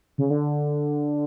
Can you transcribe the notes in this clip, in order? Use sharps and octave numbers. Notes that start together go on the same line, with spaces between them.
C#3
D3